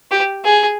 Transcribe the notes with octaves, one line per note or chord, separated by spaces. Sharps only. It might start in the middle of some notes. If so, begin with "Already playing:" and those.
G4
G#4